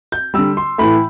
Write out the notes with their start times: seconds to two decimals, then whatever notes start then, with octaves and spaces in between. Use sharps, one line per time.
0.12 G6
0.34 D3 G3 E6
0.57 C6
0.78 A2 E3 A3 B5